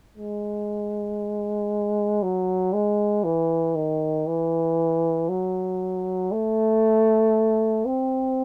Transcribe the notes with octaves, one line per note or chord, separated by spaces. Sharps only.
G#3
F#3
G#3
E3
D#3
E3
F#3
A3
C4